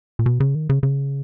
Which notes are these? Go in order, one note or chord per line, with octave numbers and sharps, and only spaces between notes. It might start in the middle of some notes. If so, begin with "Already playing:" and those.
A#2
B2
C#3
D#3
C#3
C#3